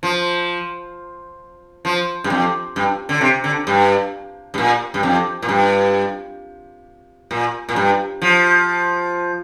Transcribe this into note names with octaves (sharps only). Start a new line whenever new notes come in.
F3
F3
G2
F2
G2
D3
C3
D3
G2
G2
A#2
G2
F2
A#2
G2
A#2
A#2
G2
F3